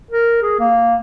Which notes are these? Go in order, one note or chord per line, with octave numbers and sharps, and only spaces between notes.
A#4
G#4
A#3